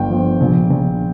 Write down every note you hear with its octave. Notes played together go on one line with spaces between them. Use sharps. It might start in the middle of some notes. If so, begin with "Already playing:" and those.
Already playing: G1 G5
F3
A#1
A#1